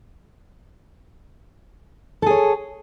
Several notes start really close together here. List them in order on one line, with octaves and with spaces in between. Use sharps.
A4 G#4 C#5